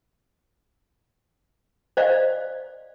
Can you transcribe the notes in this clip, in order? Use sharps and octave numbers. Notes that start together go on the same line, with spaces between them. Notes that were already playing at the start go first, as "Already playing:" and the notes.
C5 D5 D#5 F5